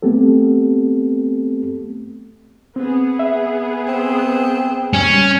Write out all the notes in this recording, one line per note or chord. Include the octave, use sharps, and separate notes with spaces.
A3 B3 C4 G4 A4
B3 C4 G#4
E5
C4
G3 C#4